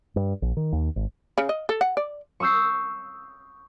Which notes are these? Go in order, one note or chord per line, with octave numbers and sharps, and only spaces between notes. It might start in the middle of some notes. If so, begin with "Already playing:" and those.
G2
A#1
D#3
D#2
G#1
C#3
D#5
A4
F#5
D5
C#6 D#6 E6 G6 C7